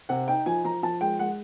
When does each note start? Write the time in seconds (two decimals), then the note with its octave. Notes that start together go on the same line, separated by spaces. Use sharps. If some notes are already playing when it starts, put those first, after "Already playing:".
0.09 C3 F#5
0.28 D#4 G5
0.46 F3 G#5
0.65 F3 A#5
0.83 F3 A5
1.01 G#3 G5
1.19 G#3 F#5